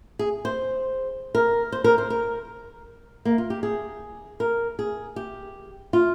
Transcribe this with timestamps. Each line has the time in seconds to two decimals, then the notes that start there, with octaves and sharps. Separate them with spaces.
0.19 G#4
0.45 C5
1.35 A#4
1.72 C5
1.84 A#4
1.98 C5
2.10 A#4
3.25 A#3
3.38 F4
3.50 G4
3.63 G#4
4.40 A#4
4.79 G#4
5.16 G4
5.93 F4